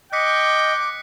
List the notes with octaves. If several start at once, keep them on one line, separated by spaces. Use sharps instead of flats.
D#5 G5 D6 F#6 B6 C#7